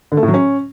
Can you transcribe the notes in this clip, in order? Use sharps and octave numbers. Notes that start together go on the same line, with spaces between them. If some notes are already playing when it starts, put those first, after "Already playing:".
D3
A3
A2
F#3
C#4